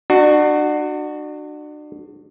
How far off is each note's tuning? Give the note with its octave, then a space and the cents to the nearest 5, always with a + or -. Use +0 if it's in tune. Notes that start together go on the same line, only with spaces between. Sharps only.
D4 +35 F#4 +0